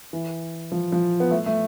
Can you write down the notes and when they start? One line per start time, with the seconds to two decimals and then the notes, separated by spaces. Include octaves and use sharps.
0.13 E3
0.72 F3
0.92 F3
1.20 B3
1.31 A3
1.46 A3